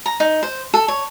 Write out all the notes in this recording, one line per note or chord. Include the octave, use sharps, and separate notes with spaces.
A#5
D#4
C5
A4
C#5